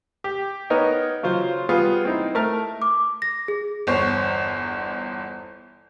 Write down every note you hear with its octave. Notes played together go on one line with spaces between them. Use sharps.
G4
B3 D#4 A#4 C#5 D#5
C#3 F#3 F4 C5
G3 B3 F4 G#4
C4 D#4 E4
A3 A#4 E5 A5 F6
D6
A#6
G#4
G1 E2 C5 C#5